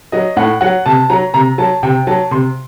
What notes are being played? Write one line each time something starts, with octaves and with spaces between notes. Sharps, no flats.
F#3 D#5
A2 F#5
F#3 F#5
C3 A5
F#3 A#5
C3 A#5
F#3 A5
C3 G5
F#3 A5
C3 C6